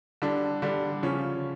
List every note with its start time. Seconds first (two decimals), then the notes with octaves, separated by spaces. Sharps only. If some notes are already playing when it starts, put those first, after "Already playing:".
0.22 D3 G3 D4
0.62 D3 G3 D4
1.03 C#3 F3 C#4